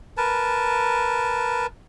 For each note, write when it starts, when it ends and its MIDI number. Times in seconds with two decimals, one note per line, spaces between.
0.17 1.66 70
0.17 1.66 71
0.17 1.66 81